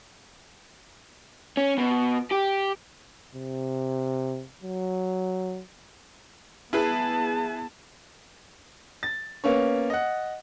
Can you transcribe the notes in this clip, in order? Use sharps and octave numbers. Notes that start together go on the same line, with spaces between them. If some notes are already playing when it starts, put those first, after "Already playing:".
C#4
B2
G4
C3
F#3
B3 E4 G#4 B4 A5
A6
A#3 B3 C#4 C#5
D#5 F#5